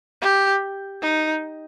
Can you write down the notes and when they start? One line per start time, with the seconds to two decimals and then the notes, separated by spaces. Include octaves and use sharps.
0.21 G4
1.02 D#4